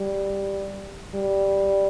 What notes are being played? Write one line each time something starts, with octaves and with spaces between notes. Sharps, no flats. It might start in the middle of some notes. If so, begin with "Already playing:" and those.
Already playing: G3
G3